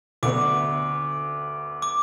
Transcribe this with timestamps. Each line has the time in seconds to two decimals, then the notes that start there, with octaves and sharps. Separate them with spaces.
0.23 D2 D3 B3 D6
1.82 D6